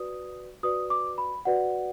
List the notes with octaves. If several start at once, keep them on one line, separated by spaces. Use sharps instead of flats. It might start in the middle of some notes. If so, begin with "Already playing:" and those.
Already playing: F#4 B4 D5 D#6
F#4 B4 D5 D#6
D6
B5
F#4 B4 D5 F#5